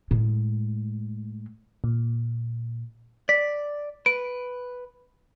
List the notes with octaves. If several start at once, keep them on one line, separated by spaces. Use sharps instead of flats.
A2 G#3
A#2
D5 B6
B4 D7